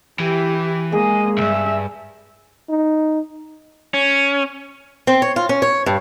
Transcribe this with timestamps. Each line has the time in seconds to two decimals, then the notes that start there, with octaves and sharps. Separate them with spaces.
0.19 E3 E4 G4
0.92 G#3 A#3 G#4 D#5
1.38 C2 G2 E5
2.69 D#4
3.94 C#4
5.07 C4
5.22 C#5
5.36 F4
5.49 C#4
5.62 C#5
5.86 G2